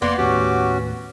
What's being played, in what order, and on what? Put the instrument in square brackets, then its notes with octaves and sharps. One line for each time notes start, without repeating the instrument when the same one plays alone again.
[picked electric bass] F1 [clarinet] A#3 [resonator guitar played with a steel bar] B3 [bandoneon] D5 F#5 C6
[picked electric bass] D#2 A2 [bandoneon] C#4 F#4 [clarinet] G4